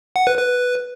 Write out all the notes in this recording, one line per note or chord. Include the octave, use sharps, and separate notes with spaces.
F#5
B4
B4